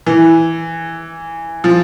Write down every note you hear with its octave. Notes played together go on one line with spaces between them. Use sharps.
E3
F3